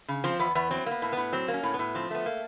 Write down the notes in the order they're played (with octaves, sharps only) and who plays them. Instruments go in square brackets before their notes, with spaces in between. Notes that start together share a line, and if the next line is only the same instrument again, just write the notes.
[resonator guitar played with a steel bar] C#3
F3 C4
E2 B3
E2 B3
F#3 C4
A#3 B3
A2
A2 B3
F#3 C4
A#3
C#4
A2
B3
A2
F3 C4
A3 B3
A#3